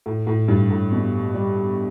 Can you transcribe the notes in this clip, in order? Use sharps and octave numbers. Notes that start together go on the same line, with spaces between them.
A2
A2
G2
A2
B2
G3